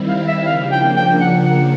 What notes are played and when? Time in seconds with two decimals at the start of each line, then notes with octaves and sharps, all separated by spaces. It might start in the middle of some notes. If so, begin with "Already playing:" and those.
Already playing: D#3 G3 C4 E4
0.09 F5
0.28 E5
0.46 C#3 F3 A#3 D4 F5
0.71 G5
0.96 G5
1.21 F#5
1.46 F#5